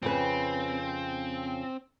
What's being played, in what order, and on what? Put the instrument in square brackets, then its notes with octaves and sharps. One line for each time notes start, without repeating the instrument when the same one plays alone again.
[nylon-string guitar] F2 C#3 B4 [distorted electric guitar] C4